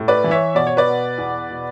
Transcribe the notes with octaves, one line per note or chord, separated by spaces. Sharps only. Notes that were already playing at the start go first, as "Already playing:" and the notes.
Already playing: A2
B4 D5
E3
C#5 E5
B2 D5
C#5
B4 D5
B2
E2
B2